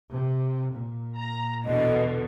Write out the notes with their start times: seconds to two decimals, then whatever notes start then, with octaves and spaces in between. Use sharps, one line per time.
0.11 C3
0.74 A#2
1.18 A#5
1.65 E2 B2 D3 D#5